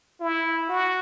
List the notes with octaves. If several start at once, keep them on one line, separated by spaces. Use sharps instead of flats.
E4
F#4